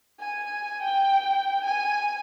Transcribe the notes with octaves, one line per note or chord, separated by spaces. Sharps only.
G#5
G5
G#5